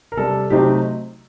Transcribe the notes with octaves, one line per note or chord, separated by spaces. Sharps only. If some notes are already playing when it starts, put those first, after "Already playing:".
A#4
C3 G3 D4 A4
C3 F#3 A3 C4 D#4 G4